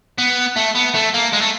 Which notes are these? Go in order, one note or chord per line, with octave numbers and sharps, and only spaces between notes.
B3
A3
B3
A3
A#3
G#3
A3